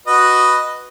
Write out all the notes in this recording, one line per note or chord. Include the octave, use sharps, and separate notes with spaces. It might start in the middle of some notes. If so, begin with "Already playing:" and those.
F#4 B4 D#5